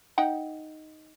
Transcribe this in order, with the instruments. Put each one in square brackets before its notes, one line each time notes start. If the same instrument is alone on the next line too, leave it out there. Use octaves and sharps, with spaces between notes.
[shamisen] D#4 F#5 G5